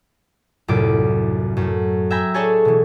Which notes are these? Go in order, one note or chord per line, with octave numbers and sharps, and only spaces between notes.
C2 F#2 A2 F4 D6
F#2 A3
E5 G5 G#5 A#5 B5
D4 G#4 A4 C#5 G#5
B2 E3